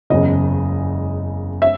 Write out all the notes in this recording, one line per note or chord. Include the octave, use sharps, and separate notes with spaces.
F#1 E2 C#3 D#5
E5